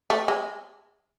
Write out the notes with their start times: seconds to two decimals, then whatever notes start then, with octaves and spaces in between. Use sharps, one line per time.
0.10 A3
0.28 G#3